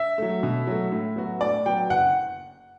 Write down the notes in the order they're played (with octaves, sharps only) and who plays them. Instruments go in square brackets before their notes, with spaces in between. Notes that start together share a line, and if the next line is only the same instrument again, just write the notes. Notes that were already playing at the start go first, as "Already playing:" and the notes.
Already playing: [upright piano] E5
[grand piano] F#3 A3
B2
F#3 A3
A2
F#3 B3 F#4
[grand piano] A2 [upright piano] D5
[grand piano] F#3 B3 F#4 [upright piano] G5
[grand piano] F#1 [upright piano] F#5